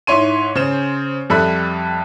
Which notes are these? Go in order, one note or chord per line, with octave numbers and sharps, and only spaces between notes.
G#2 E4 C#5 C6 D#7
C#3 C5 E7
F2 G3 A4 E5 B5 F#6